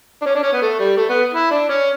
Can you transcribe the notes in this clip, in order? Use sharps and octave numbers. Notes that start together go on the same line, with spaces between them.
D4
C#4
D4
C#4
B3
A3
G3
A3
B3
E4
D4
C#4